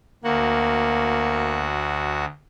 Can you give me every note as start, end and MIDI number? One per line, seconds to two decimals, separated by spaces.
0.24 2.25 38
0.24 1.72 58
0.24 2.25 66
0.24 2.25 78